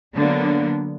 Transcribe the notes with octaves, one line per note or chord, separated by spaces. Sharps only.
D3 F#3 A#3 B3 D4